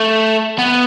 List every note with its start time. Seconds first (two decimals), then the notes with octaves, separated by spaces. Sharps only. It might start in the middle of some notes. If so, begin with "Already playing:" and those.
Already playing: A3
0.58 B3